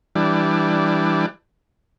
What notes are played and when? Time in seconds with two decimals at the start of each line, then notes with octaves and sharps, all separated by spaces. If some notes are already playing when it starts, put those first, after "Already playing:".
0.15 E3 G3 D4